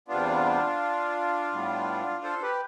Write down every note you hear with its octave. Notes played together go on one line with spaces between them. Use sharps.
E2 C3 G3 B3 D4 F4
A2 G3 B3
A4 C5
G4 B4